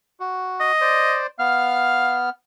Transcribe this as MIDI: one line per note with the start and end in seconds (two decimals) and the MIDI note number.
0.20 0.72 66
0.60 1.18 75
0.81 1.27 72
0.81 1.27 74
1.39 2.30 59
1.39 2.19 77
1.39 2.30 89